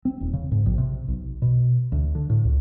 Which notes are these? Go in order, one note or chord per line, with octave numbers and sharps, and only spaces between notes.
C4
D#1
C#3
G#2
A#1
C3
B1
B2
D2
D3
A2
C#2